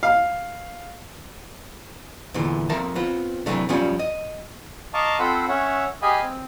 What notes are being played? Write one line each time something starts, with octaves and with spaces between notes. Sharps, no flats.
F5
E2 A#2 D3 E3
F2 F3 A#4 E5 A5
B3 C4 F4
C3 E3 F#3 A3 D4
F#2 F3 G3 C#4 F4 D5
D#5
D#5 F5 A5 A#5 C#6 D6
C4 F4 A4 C5 F#5 B5
C#4 C#5 E5 F#5
G4 G#4 D#5 F5 G#5 B5
C4